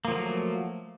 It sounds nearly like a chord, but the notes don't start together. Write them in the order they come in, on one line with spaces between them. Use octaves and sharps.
A#3 F3 F#3 A3